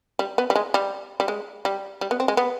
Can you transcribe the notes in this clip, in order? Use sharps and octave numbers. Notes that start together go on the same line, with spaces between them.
G3
B3
G3
G#3
G3
G3
G#3
G3
G3
B3
C4
G#3
B3